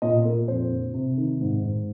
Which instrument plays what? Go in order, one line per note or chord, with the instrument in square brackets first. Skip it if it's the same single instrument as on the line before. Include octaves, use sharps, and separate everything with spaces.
[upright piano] A#2 D#5
A#2 A#4
F2 C5
D3
C3
D#3
G#2
G#2